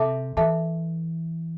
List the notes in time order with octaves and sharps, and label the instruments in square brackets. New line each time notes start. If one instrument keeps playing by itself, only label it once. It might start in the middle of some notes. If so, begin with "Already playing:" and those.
Already playing: [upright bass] C3 [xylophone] A4 E5 A5 D6
[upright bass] E3 [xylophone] A4 E5 A5 D6